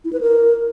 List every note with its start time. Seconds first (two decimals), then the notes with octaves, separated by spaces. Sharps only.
0.05 E4
0.13 B4
0.21 A#4